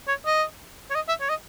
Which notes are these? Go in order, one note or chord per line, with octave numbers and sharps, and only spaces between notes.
C#5
D#5
C#5
D#5
E5
C#5
D#5